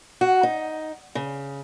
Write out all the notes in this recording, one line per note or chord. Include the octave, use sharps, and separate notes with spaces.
F#4
D#4
C#3